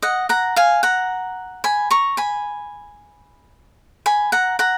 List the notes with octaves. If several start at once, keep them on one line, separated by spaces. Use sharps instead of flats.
D#5 F#5
F#5 A#5
F5 G#5
F#5 A#5
G#5 B5
A#5 C#6
G#5 B5
G#5 B5
F#5 A#5
F#5 A#5